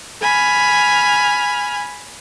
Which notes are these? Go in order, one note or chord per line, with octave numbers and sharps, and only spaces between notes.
G#5 B5 F6